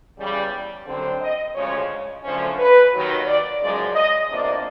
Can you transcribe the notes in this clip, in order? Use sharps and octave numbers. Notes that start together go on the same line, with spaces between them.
E2 C#3 E3 G3
F#2 D3 G3 C4
D#5
D2 C#3 F3 G#3 C#5
F#2 D3 F3 A3 C#4 C5
B4
D#2 D#3 F#3
D5
F#2 C#3 F3 G#3 D5
D#5
E2 C3 F3 A#3 D4 D5